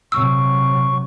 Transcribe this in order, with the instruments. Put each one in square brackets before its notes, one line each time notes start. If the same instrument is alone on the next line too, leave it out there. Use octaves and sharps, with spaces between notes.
[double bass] C3 F#3 [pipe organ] C#6 [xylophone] E6